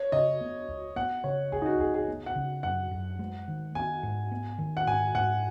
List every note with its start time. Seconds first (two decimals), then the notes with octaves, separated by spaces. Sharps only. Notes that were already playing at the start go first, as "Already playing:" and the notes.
Already playing: C#5
0.12 C#3 D#5
0.41 B3
0.68 C#2
0.96 B3 F#5
1.24 C#3 C#5
1.52 C#2 G#4
1.62 D#4
1.66 F#4
1.80 C#2 G#4
1.94 G#4
2.08 B3
2.26 F#5
2.36 C#3
2.63 F#2 F#5
2.91 F#2
3.19 G#3
3.48 D#3
3.75 B3 G#5
4.03 G#2
4.32 B3
4.58 D#3
4.77 F#5
4.87 G#2 G#5
5.15 G#2 F#5